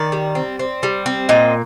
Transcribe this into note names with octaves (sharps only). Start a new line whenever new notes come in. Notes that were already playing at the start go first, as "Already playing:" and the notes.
Already playing: D#3 D5
G3
C4
C4
G3
C4
A#2 D#5